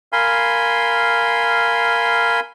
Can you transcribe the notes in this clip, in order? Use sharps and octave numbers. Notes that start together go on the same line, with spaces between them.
A#4 F5 G#5 B5 C6